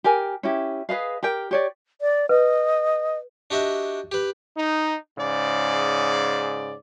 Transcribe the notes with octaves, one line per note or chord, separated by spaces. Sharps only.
G4 A#4 G#5
C#4 E4 G4
G#4 B4 D#5 F5
G4 A#4 G5
G4 C#5 D5
D5
B4 D#5
D4 F#4 G4 D#5 E5
G4 B4
D#4
G#2 C#3 D5